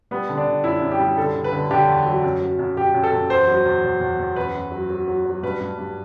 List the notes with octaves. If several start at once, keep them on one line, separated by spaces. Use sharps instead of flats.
G3 B3
D3
D4
D3
F#2 E4
F#2
G4
G3
D3 A4
D3
B4
D3
D3 G4
E2
F#3
F#2
F#3
F#2
F#2 G4
F#2
A4
F#2
E2 C5
F#3
E2
E2
E2
E2
F#2 B4
F#2
F#3
F#3
F#3
F#3
G2 B4
G2
G2